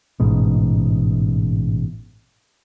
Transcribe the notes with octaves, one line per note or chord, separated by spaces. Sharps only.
A1 G#2 B2